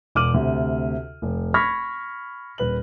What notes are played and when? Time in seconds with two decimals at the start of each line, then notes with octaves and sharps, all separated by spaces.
0.15 E1 D6 F6 D#7 F#7
0.34 D2 C3
1.22 F1
1.54 B5 C#6 F6 G#6 A#6 B6
2.58 D#1 B4 F#7